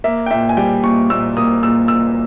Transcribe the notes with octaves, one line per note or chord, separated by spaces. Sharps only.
A#3 E5
G5
A#2 E5
G#5
G3 G5
A#2 C#6
A#2 E6
A#3 D#6
A#2 E6
A#2 E6